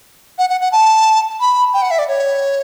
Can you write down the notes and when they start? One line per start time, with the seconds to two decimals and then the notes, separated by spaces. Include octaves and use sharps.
0.38 F#5
0.50 F#5
0.61 F#5
0.72 A5
1.40 B5
1.74 G5
1.82 F#5
1.91 E5
1.99 D5
2.08 C#5